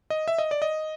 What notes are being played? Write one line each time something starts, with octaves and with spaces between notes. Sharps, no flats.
D#5
E5
D#5
D5
D#5